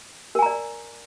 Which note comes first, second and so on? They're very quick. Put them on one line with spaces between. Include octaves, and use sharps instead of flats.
A#4 G#5 A#5 D5